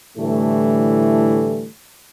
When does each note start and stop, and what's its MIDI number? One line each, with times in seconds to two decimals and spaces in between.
0.18 1.67 45
0.18 1.67 50
0.18 1.67 52
0.18 1.67 55
0.18 1.67 57